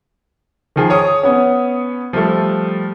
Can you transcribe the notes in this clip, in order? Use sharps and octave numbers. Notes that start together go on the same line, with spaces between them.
D#3 F3 G#4
C#5 D#6
B3 C#4
F3 G3 A3